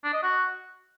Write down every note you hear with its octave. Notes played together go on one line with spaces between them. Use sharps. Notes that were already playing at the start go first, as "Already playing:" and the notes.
D4
D#5
F#4